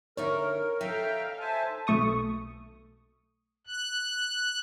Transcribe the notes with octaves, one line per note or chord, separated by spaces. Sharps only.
D3 D#4 A#4 C#5 E5
D#4 A4 E5 F5 G5 A#5
C5 E5 G#5 A5
B1 A3 C#6 D#6
F#6